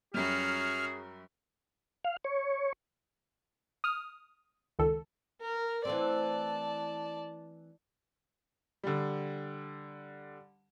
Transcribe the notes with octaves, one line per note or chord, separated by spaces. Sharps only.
F#2 G3 C#4 F#4 G#4 F6
F5
C#5
D#6 F6
C#2 D#3 A4
A#4
E3 A3 C4 D5 A5
D3 G3